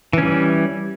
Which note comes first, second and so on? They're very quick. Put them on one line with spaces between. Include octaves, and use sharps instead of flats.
E3 C#4 G3